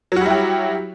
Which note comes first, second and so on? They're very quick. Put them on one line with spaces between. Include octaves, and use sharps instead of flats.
F#3 F#4 G3 E4 G4